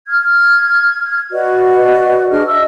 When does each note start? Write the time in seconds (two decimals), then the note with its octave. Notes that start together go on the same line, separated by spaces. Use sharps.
0.08 F6 G#6
1.31 F#4 B4 D5 D#5
2.30 D4 G#4 D#5 F6
2.47 D#5 E5 E6